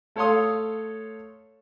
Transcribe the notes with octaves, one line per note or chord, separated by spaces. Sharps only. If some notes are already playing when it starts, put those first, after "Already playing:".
A3 A4 C#5 F5 C6 D#6